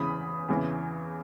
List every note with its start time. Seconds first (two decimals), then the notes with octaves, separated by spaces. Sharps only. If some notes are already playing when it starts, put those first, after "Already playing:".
Already playing: E2 C#3 E3 B5 D#6
0.48 E2 C#3 E3